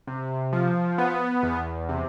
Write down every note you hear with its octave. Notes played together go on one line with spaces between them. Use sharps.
C3
F3
B3
E2
C3